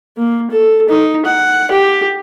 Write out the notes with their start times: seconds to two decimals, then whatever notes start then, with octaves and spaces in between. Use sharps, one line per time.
0.17 A#3
0.51 A4
0.89 D#4
1.25 F#5
1.71 G4